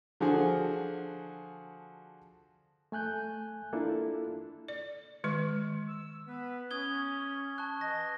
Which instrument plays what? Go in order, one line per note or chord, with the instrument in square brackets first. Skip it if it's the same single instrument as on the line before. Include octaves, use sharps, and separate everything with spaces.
[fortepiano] D3 F3 F#4 G#4
[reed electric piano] A3 G#5 F#6 G6
A#3 D4 E4 F4 A4
[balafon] D5
D#3 G#3 C#6
[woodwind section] E6
B3 B4
[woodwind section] C#4 [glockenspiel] D#6 G#6 G7
[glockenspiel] A5 C#6 F#6
[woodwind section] E3 D#5 [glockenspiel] A#6